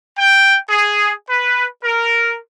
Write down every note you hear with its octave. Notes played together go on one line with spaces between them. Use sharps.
G5
G#4
B4
A#4